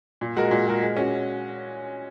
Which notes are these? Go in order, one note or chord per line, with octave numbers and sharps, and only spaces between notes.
A#2
G#3 F#4 A#4
A#2
G#3 F#4 A#4
G#3
C#4 F#4